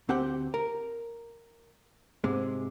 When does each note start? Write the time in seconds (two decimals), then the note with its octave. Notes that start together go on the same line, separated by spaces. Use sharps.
0.09 D2 C4 G4 F#5 G5
0.54 A#4
2.24 G#2 C3 G#3